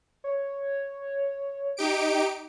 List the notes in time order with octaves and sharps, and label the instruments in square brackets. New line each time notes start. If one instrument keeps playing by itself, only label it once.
[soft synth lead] C#5
[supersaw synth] D#4 G4 D7